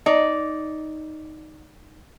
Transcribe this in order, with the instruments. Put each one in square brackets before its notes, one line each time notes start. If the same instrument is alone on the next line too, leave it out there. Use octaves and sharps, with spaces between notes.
[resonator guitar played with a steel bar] D#4 D5